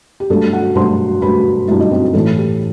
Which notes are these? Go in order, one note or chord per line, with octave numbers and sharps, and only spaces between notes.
G4
G2 F#3 A3 A4
F#4 F#5
G2 F#3 A3 C5 C6
G2 F#3 A3 B4 B5
G2 F#3 A3 E4 E5
D#4 D#5
C4 C5
A2 E3 A3 A4
G4